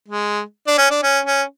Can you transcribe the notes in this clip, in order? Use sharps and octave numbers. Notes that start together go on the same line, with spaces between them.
G#3
D4
C#4
D4
C#4
C#4